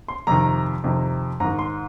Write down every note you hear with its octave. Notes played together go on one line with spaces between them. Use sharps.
C6
F2 C3 D#3 A#5
F2 C3 D#3
G#2 D#3 A#5
C6